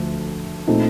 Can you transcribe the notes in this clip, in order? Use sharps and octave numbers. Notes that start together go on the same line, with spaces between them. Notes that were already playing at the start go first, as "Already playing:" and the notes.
Already playing: D2 F3 A3
A#2 A3 C4 D#4